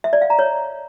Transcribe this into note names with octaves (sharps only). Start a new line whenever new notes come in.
E5
D5
F5
A#5
C#5